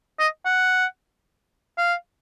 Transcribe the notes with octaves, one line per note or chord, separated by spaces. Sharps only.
D#5
F#5
F5